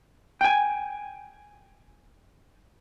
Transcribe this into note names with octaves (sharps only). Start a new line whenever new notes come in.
G5 G#5